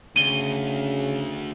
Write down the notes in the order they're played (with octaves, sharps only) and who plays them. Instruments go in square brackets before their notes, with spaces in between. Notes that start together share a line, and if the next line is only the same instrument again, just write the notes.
[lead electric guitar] D2 [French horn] C#3 [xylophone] D#7 G7